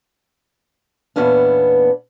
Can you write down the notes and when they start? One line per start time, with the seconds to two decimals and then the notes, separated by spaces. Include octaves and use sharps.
1.16 E2 A#2 B3 C#4 D4